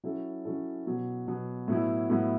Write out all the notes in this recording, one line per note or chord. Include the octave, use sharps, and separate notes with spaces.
F#3 C#4 E4 A4
F#3 C#4 E4 A4
B2 F#3 B3
B2 F#3 B3
A2 F#3 B3 E4
A2 F#3 B3 E4